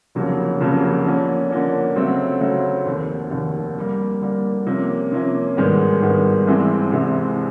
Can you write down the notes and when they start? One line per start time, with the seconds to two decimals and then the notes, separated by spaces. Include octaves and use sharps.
0.15 F1 F2 C#3 F#3 A#3
0.60 F1 F2 C#3 F#3 A#3
1.05 D3 F3 A#3 C#4
1.51 D3 F3 A#3 C#4
1.96 D2 C#3 F#3 A3 C4
2.40 D2 C#3 F#3 A3 C4
2.85 F1 D#2 D#3
3.31 F1 D#2 D#3
3.76 D3 G3 A#3
4.21 D3 G3 A#3
4.66 C3 F3 A#3 C#4
5.12 C3 F3 A#3 C#4
5.57 G#1 G2 D#3 G#3 B3
6.02 G#1 G2 D#3 G#3 B3
6.47 C2 C3 E3 G#3 C4
6.92 C2 C3 E3 G#3 C4